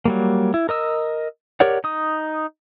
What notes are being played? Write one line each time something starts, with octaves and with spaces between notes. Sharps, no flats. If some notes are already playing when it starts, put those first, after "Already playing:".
F#3 G3 A#3
E4
A#4 D#5 E6
G4 A#4 C#5 D5 F#5
D#4 D#6